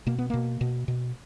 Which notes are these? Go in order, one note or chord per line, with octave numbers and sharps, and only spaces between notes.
B2 A#3
B3
B2 A#3
B2
B2